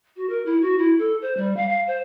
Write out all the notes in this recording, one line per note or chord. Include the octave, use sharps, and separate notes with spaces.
F#4
A#4
E4
F#4
E4
A4
C5
G3
F5
F5
C5